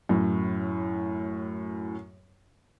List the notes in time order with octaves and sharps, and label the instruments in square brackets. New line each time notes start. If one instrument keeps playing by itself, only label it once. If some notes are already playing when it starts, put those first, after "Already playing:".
[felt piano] F#2 A2